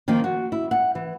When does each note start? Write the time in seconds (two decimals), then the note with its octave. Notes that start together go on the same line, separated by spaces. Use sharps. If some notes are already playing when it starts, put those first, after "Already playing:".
0.08 D#3 F3 A#3 D#4
0.24 F#4
0.52 E4
0.71 F#5
0.95 E3